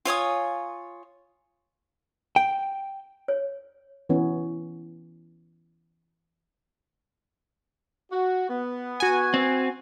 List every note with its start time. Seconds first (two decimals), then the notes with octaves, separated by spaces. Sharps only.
0.05 F4 C#5 G#5 D#6
2.36 G5
3.28 C#5
4.09 E3 B3 C#4
8.11 F#4
8.49 B3
9.00 F#4 G#5
9.34 C4